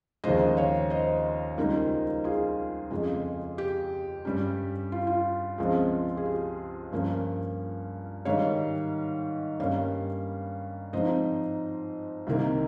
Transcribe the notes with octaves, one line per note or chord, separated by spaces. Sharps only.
D#2 C#3 F3 G#3 C5 D#5
C#5 F5
C5 D#5
C#2 C#3 G3 A#3 D#4
F4 G#4
F2 C#3 G#3
G4
G2 G3 C#4
F4
F4
C#2 C#3 F3 G#3 C4
G#4
G4
G2 F3 A#3 C#4
G#2 D#3 G3 C#5 F5
G2 G3 A#3 C#4 C#5 F5
G#2 F3 C4 D#4 C5 D#5
C2 C3 D#3 A#3